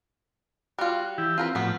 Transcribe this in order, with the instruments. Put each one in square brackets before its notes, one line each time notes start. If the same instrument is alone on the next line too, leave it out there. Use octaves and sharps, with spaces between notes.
[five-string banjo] G3 F4 [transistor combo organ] F#4
[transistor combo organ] E3 E4 G4
[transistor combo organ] C4 [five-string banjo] F4 A#4 B4
[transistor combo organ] A2 F3 B5 [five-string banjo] F#3 B3